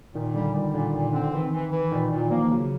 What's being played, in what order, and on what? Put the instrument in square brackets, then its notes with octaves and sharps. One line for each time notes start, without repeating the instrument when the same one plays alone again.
[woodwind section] A#2 [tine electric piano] D#3
[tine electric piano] D3 [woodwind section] G3
[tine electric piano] D#3 [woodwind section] G3
[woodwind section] A#2 [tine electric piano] D3
[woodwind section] A#2 [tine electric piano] D#3
[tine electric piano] D3 [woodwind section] C4
[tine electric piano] D#3 [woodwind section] E3
[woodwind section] E3
E3
[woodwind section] A#2 [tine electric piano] D#3
[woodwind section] A#2 [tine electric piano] E3
[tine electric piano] F3 [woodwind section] A#3
[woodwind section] C#3 [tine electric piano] F#3